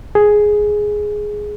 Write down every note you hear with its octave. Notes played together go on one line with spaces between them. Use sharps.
G#4